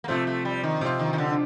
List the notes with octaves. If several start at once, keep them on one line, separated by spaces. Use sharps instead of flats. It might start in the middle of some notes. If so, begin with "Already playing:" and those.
A#3
C3 F3 A3 C4 F4
A3
G3
D#3
C3 F3 C4 F4
D#3
D#3
D3